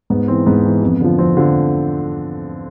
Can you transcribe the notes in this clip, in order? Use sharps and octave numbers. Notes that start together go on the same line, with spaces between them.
G#2 B3
E3 C4
G#2 B3
E3
F2
D3 F3
F2 C4
D3 F3